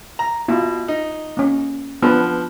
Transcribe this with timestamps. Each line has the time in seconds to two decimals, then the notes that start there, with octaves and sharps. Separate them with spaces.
0.19 A#5
0.48 B2 E4 F4
0.88 D#4
1.37 A#3 C#4
2.02 F3 B3 D4 B4